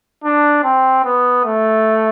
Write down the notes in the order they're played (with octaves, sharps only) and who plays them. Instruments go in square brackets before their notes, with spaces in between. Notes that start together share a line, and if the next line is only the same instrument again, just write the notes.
[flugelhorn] D4
C4
B3
A3